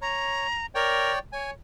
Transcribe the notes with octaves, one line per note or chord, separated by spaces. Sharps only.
C#5 A#5
A#4 C#5 D5 G5
C#5 G#5